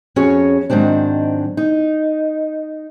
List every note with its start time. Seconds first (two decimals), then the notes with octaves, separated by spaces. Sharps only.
0.16 F2 C#4 F#4 G#4 C#5
0.70 G#2 D#3 F#3 C4 D4
1.57 D#4